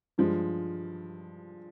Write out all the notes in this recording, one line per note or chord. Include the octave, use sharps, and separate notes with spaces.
G2 F3 G#3